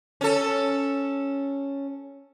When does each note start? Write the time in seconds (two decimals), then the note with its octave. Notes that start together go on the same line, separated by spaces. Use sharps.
0.21 C#4 A4